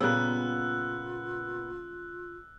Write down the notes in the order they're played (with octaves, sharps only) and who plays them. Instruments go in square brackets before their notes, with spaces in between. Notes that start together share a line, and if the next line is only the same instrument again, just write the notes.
[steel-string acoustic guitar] A#2 B3 [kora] C#3 G3 A#3 [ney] F4 [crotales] E6 F#6